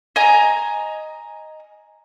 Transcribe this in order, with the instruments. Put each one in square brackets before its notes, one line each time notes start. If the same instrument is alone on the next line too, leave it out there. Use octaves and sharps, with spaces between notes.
[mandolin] D#5 G#5 A#5